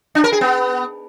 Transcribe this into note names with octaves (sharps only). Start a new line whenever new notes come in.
D4
A#4
G#4
B3